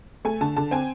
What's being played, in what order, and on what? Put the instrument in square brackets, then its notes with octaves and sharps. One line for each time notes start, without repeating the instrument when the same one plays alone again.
[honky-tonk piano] A3 G#5
D3 A5
D3 A5
C4 G#5